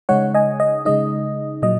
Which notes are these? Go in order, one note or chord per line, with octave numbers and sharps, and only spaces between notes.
C#3 G#3 D#4 C#5 F#5
D#5 G#5
D#5
C#3 G#3 D#4 D#5
A#2 F#3 D#5